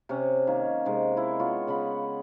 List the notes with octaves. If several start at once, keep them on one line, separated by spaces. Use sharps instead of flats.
C3 C#4
D#3 A#3 C#5
C3 D#3 G#3
E4
B3 F4 C#5
C#3 B3 F#5 B5